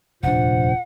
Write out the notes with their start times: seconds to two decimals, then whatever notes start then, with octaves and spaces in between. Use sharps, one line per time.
0.23 F1 D#2 A#2 D4 C5 F#5